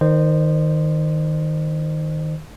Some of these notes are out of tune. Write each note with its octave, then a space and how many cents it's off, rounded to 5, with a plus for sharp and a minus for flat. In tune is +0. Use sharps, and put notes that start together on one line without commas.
D#3 +0 C5 -5 D#5 -40